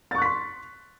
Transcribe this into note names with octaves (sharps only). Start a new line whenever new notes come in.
C6 C#6 F#6 A6 B6